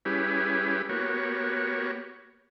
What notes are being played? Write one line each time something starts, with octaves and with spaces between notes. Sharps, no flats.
G3 C#4 E4 G4 G#4 B4
A#3 B3 F#4 G4 C#5